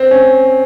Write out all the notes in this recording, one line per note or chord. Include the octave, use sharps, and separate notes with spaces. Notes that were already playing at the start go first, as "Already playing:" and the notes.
Already playing: C4
C#4